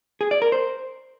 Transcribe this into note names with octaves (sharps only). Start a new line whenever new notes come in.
G#4
D5
A#4
C5